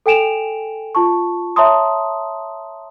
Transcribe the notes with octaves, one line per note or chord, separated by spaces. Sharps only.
A4 G5 G#5 D7 E7 F7
F4 A5 C#6
C#5 E5 A5 A#5 C6 D#6